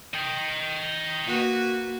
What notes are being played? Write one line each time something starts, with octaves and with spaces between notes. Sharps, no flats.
D#5 G5
A#3 F#4 B4